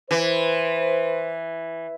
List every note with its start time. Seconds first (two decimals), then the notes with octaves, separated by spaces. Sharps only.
0.11 E3 B4 C5